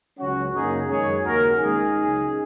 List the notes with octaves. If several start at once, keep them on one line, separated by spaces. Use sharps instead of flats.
C#2 C#3 F#3 C#4 F#4
F#2 C#3 A#3 C#4 D#4 G#4
F#2 D#3 G#3 C#4 G#4 C#5
D#2 C#3 A#3 F#4 A#4
A#2 G#3 C#4 D#4 G#4
C#2 C#3 F#3